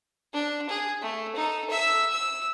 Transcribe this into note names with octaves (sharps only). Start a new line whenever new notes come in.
D4
G#4
A3
D#4 A4
E5 E6
E6